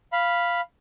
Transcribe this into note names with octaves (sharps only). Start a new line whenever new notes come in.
F5 B5